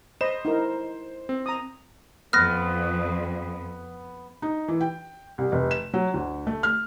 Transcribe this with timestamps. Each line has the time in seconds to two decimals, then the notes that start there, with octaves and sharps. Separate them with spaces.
0.21 C5 D#5 B5 E7
0.45 D#4 E4 A#4
1.29 C4
1.46 A#5 D#6
2.33 F2 B3 F6 A#6
4.42 D#4
4.68 E3
4.81 G5
5.38 C2
5.52 F1
5.71 E7
5.94 F#3
6.14 D2
6.47 A3
6.63 F6